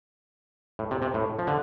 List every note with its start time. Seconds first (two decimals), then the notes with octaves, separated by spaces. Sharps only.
0.79 A2
0.91 C3
1.02 C3
1.14 A2
1.39 F3
1.47 D3